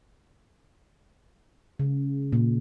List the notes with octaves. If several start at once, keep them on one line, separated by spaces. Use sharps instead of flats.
C#3
A#2